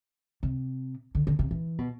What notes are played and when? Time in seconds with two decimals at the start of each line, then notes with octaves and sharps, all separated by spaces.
0.43 C3
1.15 D3
1.27 D3
1.39 C3
1.51 E3
1.78 B2